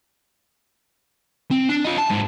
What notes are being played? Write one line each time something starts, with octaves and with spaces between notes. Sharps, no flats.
C4
D4
F4 D#5
A5
G#2